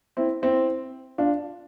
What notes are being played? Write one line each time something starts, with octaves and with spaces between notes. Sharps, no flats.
C4 E4
C4 E4
D4 F4